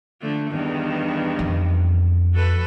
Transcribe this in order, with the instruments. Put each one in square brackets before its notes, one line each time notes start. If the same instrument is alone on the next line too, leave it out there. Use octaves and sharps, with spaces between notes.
[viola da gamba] D3 F3 A3
E2 G2 D#3
[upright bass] F2
[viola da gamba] F#4 A4 B4